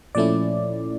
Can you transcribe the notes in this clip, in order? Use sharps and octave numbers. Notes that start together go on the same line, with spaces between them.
A#2 F3 A3 C#4 E4 D5